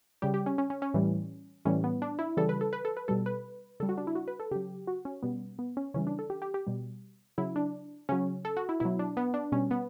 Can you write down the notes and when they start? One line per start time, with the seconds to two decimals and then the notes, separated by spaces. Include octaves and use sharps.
0.22 C#3 G3 G4
0.34 G4
0.46 C#4
0.58 C#4
0.70 C#4
0.82 C#4
0.94 A2 E3 G3
1.65 A2 E3 G3 C#4
1.84 B3
2.02 D4
2.19 E4
2.37 C#3 E3 G3 A4
2.49 B4
2.61 A4
2.73 B4
2.85 A4
2.97 B4
3.08 B2 G3 A4
3.26 B4
3.80 C#3 G3 A4
3.89 F#4
3.98 D4
4.07 E4
4.15 F#4
4.28 B4
4.40 A4
4.51 C#3 F#3 G4
4.87 F#4
5.05 C#4
5.23 B2 G3 B3
5.59 B3
5.77 C#4
5.94 C#3 E3 G3 C#4
6.07 D4
6.19 A4
6.30 G4
6.42 G4
6.54 G4
6.67 B2 G3
7.38 C#3 F#3 E4
7.56 D4
8.09 C#3 F#3 C#4
8.45 A4
8.57 F#4
8.69 E4
8.80 B2 F#3 E4
8.99 D4
9.17 B3
9.34 D4
9.52 B2 G3 C#4
9.71 B3